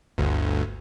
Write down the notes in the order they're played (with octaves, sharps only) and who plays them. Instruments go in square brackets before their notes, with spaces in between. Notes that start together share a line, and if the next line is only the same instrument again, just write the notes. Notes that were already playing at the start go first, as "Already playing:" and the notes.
[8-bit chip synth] G1 D2